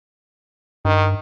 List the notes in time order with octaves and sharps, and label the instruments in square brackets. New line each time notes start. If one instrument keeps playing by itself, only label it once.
[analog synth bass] G2 [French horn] D#3